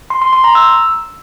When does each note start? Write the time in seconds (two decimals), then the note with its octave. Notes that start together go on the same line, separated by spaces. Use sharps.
0.10 C6
0.22 C6
0.33 C6
0.44 A#5
0.55 E6